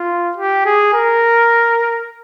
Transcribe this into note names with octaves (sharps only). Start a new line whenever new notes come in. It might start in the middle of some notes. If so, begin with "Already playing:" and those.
Already playing: F4
G4
G#4
A#4